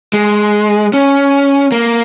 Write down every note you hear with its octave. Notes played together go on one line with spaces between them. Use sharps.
G#3
C#4
A#3